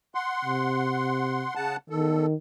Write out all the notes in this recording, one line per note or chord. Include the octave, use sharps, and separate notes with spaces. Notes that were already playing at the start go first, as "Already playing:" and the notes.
F#5 C6
C3
C#3 F#5 A5
E2 D#3 A4